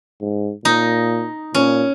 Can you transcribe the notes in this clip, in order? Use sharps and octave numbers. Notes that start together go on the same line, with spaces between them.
G#2
A#2 D#4
A#2 C#4